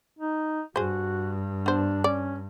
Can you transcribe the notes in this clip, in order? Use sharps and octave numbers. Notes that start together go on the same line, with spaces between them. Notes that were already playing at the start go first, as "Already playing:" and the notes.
D#4
G2 F#4 G#4 C5
B3 D4 C5
C#4 D5